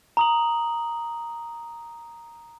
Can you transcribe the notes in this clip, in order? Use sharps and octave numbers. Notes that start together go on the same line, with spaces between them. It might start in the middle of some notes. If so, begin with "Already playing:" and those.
A#5 D#6 F#7